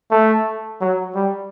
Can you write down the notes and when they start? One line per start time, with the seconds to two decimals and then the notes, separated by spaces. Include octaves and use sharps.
0.11 A3
0.81 F#3
1.15 G3